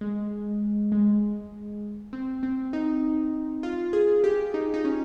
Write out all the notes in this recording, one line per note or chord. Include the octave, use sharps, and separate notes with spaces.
G#3
G#3
C4
C4
D#4
F4
G#4
G4
D#4
D#4
C#4